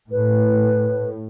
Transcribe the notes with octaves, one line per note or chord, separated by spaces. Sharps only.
A2 B4